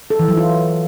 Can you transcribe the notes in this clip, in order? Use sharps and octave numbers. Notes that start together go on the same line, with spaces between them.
A4
E3
F#3
F4